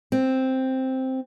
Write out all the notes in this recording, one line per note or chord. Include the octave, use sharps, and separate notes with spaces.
C4